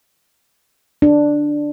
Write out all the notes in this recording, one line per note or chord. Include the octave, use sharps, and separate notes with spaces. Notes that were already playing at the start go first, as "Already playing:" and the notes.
D4